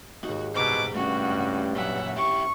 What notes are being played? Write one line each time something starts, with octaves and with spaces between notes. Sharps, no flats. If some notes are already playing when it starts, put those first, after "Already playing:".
D#2 G#2 D#4 F#4
C2 B2 C5 A#5 D6 F6
G2 A3 C#4 F#4
F#2
A#2 F#3 F#4 B4 C#5 E5 F#5
E4 G4 C#6